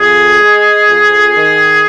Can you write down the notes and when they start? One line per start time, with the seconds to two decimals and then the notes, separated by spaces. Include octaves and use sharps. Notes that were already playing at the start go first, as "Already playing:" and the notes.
Already playing: F2 G#4
0.40 G#3
0.88 F2
1.35 D#3